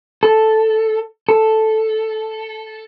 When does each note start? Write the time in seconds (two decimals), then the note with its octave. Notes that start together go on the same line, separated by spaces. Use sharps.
0.23 A4
1.29 A4